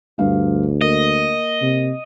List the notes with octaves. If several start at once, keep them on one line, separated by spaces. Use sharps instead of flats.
D2 G2 F5
A#3 D#5
C3